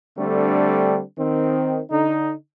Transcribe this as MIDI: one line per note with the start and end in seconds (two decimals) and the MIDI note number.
0.18 1.00 50
0.18 1.00 55
0.18 1.00 57
0.18 1.00 60
0.18 1.00 62
1.18 1.80 51
1.18 1.80 60
1.91 2.33 50
1.91 2.33 63